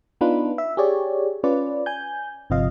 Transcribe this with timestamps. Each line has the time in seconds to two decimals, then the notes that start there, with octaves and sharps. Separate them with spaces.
0.21 B3 D4 D#4 F4 B4
0.58 E5
0.77 G4 G#4 C#5 D5
1.44 C#4 F4 B4 D5
1.86 G#5 G6
2.50 G1 C3 F3 F4 D#5 F5